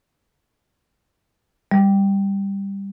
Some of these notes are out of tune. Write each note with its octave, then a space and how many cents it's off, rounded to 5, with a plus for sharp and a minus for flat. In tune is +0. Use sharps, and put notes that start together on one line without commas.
G3 +10